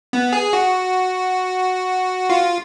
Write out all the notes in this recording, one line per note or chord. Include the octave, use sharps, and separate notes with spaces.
B3
G#4
F#4
F4